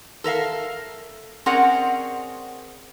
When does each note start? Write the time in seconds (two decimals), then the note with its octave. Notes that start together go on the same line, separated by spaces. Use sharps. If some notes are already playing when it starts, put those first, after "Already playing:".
0.24 A4 A#4 E5 F5
1.46 C4 C#4 G#4 A#4 D5 F#5